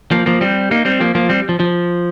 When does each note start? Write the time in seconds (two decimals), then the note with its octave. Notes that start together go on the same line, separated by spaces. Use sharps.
0.11 F3 A#3
0.26 F3 A#3
0.41 G3 C4
0.71 A#3 D#4
0.85 G3 C4
1.00 F3 A#3
1.15 F3 A#3
1.29 G3 C4
1.49 F3
1.60 F3